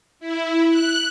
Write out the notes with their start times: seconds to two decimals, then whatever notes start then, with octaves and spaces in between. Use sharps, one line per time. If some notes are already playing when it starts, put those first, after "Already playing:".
0.19 E4
0.69 F#6